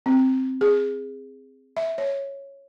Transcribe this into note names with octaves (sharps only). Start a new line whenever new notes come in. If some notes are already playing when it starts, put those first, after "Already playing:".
C4
G#4
E5
C#5